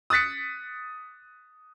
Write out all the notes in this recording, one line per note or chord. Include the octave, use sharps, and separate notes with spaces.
D#6 F#6 A6 B6 C#7